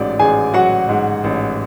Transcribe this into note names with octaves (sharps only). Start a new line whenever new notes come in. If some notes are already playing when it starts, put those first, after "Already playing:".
Already playing: A1 G#2 F#3 D5
A1 G#4 G#5
F#3 F#4 F#5
G#2
A1